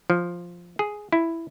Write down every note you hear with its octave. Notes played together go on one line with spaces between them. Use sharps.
F3
G#4
E4